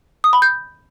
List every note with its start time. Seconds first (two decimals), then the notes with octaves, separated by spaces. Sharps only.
0.24 D#6
0.33 B5
0.42 G6